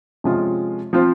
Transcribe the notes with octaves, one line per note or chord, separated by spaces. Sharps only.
C3 F3 G#3 C#4 F4
F3 C4 F4 C5